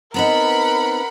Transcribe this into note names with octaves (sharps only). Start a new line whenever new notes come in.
B3 C4 D#4 A#4 F#5 B5